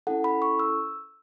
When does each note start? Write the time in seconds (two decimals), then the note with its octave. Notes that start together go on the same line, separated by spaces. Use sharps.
0.07 C#4 E4 A4 F#5
0.24 B5
0.42 C#6
0.59 E6